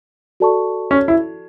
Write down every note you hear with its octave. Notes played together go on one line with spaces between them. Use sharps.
F#4 A4 D5 A5 C#6
C#4
E4